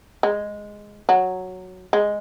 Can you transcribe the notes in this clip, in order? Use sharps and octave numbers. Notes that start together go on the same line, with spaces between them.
G#3
F#3
G#3